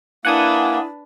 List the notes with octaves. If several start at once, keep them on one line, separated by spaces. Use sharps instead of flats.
A#3 D4 E4 B4 F#5 G#5 D#6